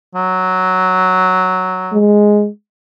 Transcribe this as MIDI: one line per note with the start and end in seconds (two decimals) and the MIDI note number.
0.15 2.02 54
1.93 2.48 56